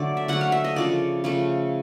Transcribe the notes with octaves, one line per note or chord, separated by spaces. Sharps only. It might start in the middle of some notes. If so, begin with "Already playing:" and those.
Already playing: D3 F#3 A3 D5
E5
D3 F#3 A3 F#5
F5
E5
D#5
C#3 F3 A3 D5
C#3 F3 A3